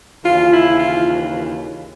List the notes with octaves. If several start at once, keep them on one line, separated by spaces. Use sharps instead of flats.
D#2 C#3 E3 F4
E4
F4